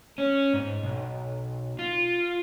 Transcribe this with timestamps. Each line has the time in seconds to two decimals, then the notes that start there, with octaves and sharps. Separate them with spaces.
0.18 C#4
0.54 G#2
0.83 B1
1.79 F4